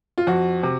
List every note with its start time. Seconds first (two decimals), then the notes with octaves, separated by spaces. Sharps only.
0.18 F4
0.27 F2 F#4
0.63 C3